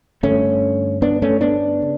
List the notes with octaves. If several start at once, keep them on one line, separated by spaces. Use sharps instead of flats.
G2 D3 A3 C#4
B3 D4
A3 C#4
B3 D4
C#3